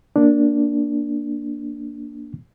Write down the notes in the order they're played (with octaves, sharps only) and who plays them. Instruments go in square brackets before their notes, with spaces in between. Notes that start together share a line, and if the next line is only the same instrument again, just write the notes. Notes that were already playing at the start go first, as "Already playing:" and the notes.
[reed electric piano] A#3 D4